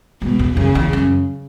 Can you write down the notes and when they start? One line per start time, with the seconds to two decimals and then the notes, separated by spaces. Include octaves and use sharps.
0.22 G#2 B2
0.39 E2
0.57 F#2 C#3
0.75 E2
0.93 F#2